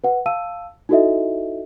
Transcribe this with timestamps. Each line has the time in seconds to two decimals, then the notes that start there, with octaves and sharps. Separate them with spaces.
0.04 B4 F#5
0.26 F5 A5 E6 D#7
0.89 D#4 E4 F#4 A4 D#5 E5